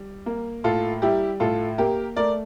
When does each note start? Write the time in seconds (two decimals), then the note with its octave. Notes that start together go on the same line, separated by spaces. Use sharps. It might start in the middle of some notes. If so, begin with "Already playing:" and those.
Already playing: G3
0.26 A#3
0.64 A2 F4 A4
1.02 G3 E4 G4
1.40 A2 F4 A4
1.78 A#3 G4 A#4
2.16 A3 A#4 D5